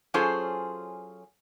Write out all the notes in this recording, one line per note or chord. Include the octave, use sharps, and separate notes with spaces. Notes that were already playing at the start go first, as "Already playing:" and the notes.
F#3 C#4 F4 G#4 A4 C5